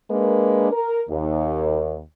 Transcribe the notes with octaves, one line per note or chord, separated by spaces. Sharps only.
G#3 A#3 D4 A#4 B4
A#4
D#2